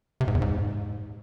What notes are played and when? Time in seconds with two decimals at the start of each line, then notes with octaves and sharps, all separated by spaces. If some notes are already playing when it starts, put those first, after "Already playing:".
0.21 C3
0.28 G#2
0.35 E2
0.42 G#2